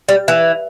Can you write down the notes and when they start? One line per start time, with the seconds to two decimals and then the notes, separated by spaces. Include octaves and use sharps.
0.09 G3
0.28 E3